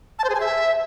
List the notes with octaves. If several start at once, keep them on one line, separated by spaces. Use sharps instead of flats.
A5
C5
G#4
G#5
E5